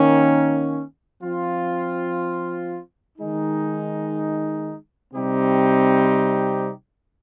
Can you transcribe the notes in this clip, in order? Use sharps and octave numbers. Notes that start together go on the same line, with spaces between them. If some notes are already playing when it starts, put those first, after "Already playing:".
Already playing: D#3 A#3 C#4
F3 C4 F4
D#3 G#3 D#4
C3 G3 C4 D#4 G4